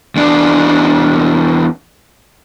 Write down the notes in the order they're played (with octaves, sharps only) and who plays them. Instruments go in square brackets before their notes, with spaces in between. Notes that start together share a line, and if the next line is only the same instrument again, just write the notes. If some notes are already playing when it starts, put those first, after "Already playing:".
[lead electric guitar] E2 D4